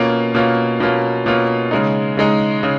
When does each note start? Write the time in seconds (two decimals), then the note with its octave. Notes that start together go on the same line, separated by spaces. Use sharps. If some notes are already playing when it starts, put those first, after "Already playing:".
Already playing: B2 A#3 C#4 F4
0.34 B2 A#3 C#4 F4
0.80 B2 A#3 C#4 F4
1.26 B2 A#3 C#4 F4
1.71 C#3 G#3 D#4
2.17 C#3 G#3 D#4
2.63 C#3